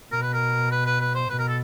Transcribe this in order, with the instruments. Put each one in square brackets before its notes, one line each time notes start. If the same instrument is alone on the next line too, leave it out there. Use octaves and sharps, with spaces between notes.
[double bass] B2 [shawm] A#4
[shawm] B4
A#4
B4
B4
B4
C5
[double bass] B2 [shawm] B4
[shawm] A#4
A4